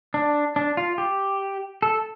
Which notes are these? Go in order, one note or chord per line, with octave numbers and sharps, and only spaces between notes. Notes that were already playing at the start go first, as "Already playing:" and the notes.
D4
D4
F4
G4
A4